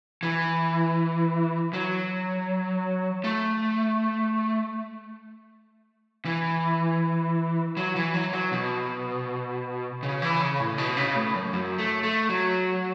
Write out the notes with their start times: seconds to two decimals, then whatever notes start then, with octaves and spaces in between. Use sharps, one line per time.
0.23 E3
1.73 F#3
3.24 A3
6.25 E3
7.77 F#3
7.96 E3
8.14 F#3
8.33 F#3
8.52 B2
10.03 C#3
10.22 E3
10.41 C#3
10.60 A2
10.78 B2
10.97 C#3
11.16 A2
11.35 F#2
11.53 F#2
11.78 A3
12.03 A3
12.29 F#3